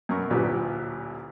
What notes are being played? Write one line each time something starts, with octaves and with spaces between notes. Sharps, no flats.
F#2 B2 A#4 C#6
A1 D2 A#2 F#3 G4 B4